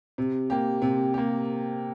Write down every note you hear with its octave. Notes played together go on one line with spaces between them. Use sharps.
C3
A#3 G4
C3
A#3 G4